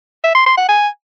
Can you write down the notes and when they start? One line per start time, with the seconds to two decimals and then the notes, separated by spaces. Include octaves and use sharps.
0.24 E5
0.35 C6
0.46 C6
0.57 F#5
0.69 G#5